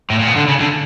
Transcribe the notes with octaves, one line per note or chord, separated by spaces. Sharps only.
A2
A#2
B2
D3
C#3
D3